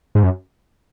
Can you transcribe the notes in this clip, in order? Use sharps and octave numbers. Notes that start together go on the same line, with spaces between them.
G#2
F#2